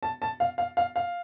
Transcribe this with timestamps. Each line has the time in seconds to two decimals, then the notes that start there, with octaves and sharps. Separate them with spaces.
0.03 A5
0.22 A5
0.40 F5
0.58 F5
0.77 F5
0.96 F5